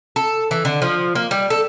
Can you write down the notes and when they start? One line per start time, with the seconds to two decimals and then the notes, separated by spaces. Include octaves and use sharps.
0.16 A4
0.51 E3
0.65 D3
0.82 F3
1.15 A#3
1.31 G3
1.50 A4